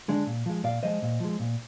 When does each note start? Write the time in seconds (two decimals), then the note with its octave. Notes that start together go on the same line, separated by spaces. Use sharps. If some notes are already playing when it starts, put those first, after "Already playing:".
0.08 D3 G#3 D4
0.27 A#2
0.46 F3 G#3
0.64 A#2 D5 F5
0.83 F3 G#3 C5 D#5
1.02 A#2
1.20 F3 G#3
1.40 A#2